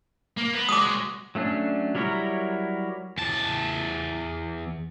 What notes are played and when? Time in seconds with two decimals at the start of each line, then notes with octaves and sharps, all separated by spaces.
0.37 A#3
0.53 B3
0.69 G#3 F#4 D6 D#6
1.35 F#3 A3 C#4 D4
1.95 F#3 G3 E4 A#4 C#5
3.18 E2 A5